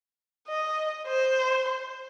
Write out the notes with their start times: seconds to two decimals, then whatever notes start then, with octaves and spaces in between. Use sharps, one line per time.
0.48 D#5
1.07 C5